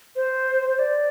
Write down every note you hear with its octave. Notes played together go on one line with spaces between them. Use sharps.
C5
C5
D5